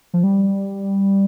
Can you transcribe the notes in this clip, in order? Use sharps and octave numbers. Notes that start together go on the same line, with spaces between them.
F3
G3